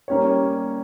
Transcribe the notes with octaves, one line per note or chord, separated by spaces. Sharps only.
G3 A#3 C#4 G4 C#5